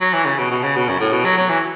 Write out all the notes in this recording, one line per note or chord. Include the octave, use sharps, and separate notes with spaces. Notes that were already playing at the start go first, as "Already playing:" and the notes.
F#3
E3
C#3
B2
B2
C#3
B2
F#2
A2
B2
F#3
F#3
E3